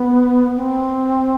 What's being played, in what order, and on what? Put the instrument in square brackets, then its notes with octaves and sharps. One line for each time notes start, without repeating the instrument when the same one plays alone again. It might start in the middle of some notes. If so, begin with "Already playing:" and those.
Already playing: [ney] B3
C4